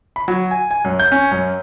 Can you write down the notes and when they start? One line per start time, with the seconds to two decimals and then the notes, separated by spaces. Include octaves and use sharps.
0.16 B5
0.28 F#3
0.51 G#5
0.71 G#5
0.85 F#2
1.00 G6
1.12 C#4
1.31 F#2